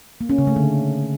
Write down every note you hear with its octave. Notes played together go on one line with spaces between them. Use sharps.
A#3
C#4
C#3
A3
D3